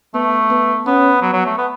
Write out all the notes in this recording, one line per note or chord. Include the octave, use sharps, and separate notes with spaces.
A3 B3
B3
B3 C#4
F#3 B3
F#3
A3
B3